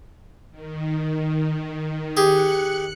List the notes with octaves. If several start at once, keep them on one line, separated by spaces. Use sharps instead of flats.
D#3
G4 G#4 F#6 C#7